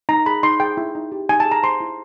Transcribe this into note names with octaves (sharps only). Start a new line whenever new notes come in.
D#4 A#5
G#4 B5
D#4 C6
G#4 G5
E4
D#4
G4
D#4 G#5
A5
G#4
A#5
C5 C6
E4